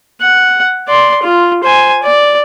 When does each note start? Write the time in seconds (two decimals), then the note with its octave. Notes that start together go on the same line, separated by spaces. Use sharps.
0.21 F#5
0.88 D5 C6
1.22 F4
1.63 C5 G#5
2.03 D5